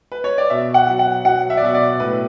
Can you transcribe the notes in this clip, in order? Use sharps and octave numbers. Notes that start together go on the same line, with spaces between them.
B4
C#5
D5
B2 E5
F#5
F#3
F#5
F#3 F#5
E5
D5
B2 E5
D5
A2 B4